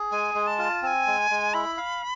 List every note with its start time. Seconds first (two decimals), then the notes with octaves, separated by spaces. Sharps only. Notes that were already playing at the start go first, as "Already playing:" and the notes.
Already playing: G#4
0.11 G#3 G#5
0.35 G#3
0.47 A5
0.58 F4
0.82 C4 A5
0.87 G#5
1.07 G#3
1.31 G#3
1.54 E4 B5
1.77 F5